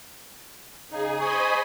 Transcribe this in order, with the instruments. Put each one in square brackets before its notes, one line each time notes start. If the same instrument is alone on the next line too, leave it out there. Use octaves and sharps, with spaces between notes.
[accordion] C#3 D#4 [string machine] G#4
[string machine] C5 D#5 B5 [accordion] G#5 D#6 [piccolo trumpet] C#6